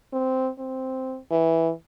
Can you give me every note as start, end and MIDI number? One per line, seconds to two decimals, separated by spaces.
0.13 0.50 60
0.59 1.17 60
1.31 1.71 52